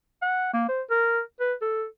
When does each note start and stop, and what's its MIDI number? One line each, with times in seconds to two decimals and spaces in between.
0.22 0.54 78
0.54 0.68 58
0.69 0.82 72
0.90 1.20 70
1.40 1.53 71
1.62 1.85 69